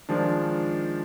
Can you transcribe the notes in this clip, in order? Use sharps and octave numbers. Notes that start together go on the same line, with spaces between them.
D#3 F3 G#3 D4